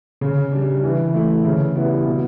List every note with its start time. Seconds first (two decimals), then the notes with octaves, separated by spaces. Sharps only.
0.21 C#3
0.52 G3 D4
0.84 E3
1.14 A3 E4
1.45 C#3
1.76 G3 B3 E4
2.06 B2